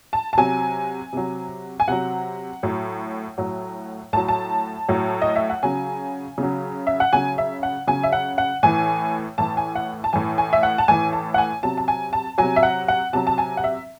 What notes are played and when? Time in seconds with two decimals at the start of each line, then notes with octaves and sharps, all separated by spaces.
0.13 A5
0.33 A5
0.38 C3 F#3 G#5
1.13 C3 F#3
1.80 G#5
1.88 C3 F#3 F#5
2.63 A2 F#3
3.38 A2 F#3
4.13 A2 A5
4.17 F#3
4.28 A5
4.88 A2 F#3
5.22 D#5
5.36 E5
5.50 F#5
5.63 C#3 F#3 G#5
6.38 C#3 F#3
6.87 E5
7.00 F#5
7.13 C#3 F#3 G#5
7.38 E5
7.63 F#5
7.87 C#3 F#3 G#5
8.03 E5
8.12 F#5
8.38 F#5
8.63 A2 E3 G#5
9.38 A2 E3 A5
9.57 G#5
9.75 F#5
10.04 A5
10.13 A2 E3 G#5
10.38 G#5
10.53 E5
10.63 F#5
10.78 A5
10.88 A2 E3 G#5
11.13 A5
11.34 F#5
11.38 G#5
11.63 C3 F#3 A5
11.77 A5
11.88 G#5
12.13 A5
12.38 C3 F#3 G#5
12.56 E5
12.63 F#5
12.88 F#5
13.13 C3 F#3 A5
13.27 A5
13.38 G#5
13.57 F#5
13.64 E5